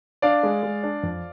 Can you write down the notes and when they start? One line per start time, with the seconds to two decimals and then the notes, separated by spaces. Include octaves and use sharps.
0.22 D4 D5 F5
0.43 G#3
0.63 G#3
0.83 D4
1.03 F2